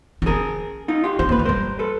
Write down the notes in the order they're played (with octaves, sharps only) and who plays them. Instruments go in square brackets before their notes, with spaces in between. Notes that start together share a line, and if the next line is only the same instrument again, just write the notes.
[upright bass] C4
[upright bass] C#4 [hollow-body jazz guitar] G#4 A#4
[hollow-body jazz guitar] D#4 F4
F4 G4
[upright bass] C4 [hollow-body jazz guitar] C5
[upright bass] A#3 [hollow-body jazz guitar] B4
[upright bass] G#3
[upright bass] G3 [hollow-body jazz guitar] A#4 C5
[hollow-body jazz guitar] A4 B4